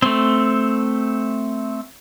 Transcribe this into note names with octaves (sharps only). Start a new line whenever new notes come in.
A3 C4